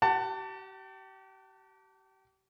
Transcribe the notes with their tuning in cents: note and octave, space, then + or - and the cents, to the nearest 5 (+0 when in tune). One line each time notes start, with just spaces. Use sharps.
G4 -35 F#5 +25 A5 +25